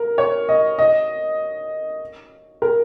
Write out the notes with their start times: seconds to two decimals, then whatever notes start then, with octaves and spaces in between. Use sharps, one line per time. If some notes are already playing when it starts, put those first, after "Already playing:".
Already playing: A#4
0.18 C#5
0.49 D#5
0.79 D#5
2.62 A#4